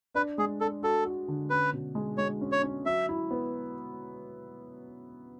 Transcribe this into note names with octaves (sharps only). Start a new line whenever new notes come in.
D4 B4
G#3 G#4
D4 A4
F#4 A4
F#4
D3
C#4 B4
B2
G#3
G#3 C#5
C#4
C#5
C#4
F#3 E5
E4
B3